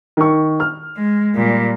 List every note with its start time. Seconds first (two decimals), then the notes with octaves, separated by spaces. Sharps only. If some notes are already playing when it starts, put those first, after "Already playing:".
0.17 D#3 C#6
0.60 F6
0.97 G#3
1.35 A#2 G3